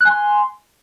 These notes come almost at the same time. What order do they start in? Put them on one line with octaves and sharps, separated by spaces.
F#6 G#5 C6